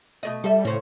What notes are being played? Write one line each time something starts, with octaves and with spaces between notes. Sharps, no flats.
B2 A3 D#5
G3 A4 E5
A2 C#3 C4 C#4